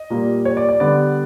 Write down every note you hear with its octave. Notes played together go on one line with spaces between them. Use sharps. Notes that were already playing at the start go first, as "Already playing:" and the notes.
Already playing: D#5
A#2 G3 A#3
C#5
D5
D5
D3 G3 B3 D5